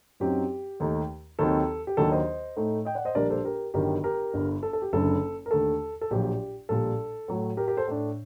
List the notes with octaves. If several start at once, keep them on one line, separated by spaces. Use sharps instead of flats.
F#2 F#3 C4 D#4 G4
D#2 D#3 A3 D#4
D#2 D#3 F#3 C4 D#4 A4
G4
D#2 D#3 F#3 A#3 D4 A4
C5 D#5
A2 A3 D#4
D#5 G5
D5 F#5
C5 D#5
A#1 A#2 G3 A#3 D4 A#4 D5
A4 C5
G4 A#4
G1 G2 D#3 F#3 G4 A#4
G4 A#4
G1 G2 D3
A4
A4
G4
F#1 F#2 D3 A4
A#4
D#2 D3 A3 A4
A4
A#1 A#2 F#3 G4
A#1 A#2 G3 A4
A2 F#3 A3
G4 A#4
G4 A#4
A4 C5
A2 A3 D4